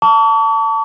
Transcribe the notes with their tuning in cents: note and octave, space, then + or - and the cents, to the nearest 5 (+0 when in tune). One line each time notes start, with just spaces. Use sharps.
A5 +20 C#6 +45